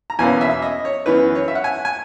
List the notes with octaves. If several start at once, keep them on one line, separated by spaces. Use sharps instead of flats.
A#5
E2 B2 A#3 C#4 G#5
E5
D#5
C#5
F#2 E3 B3 B4
C#5
E5
F#5
G#5
G#5